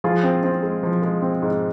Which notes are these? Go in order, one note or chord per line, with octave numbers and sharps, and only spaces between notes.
F3 F4 G#4
C4
C4
G#3
F3
G#3
C4
G#2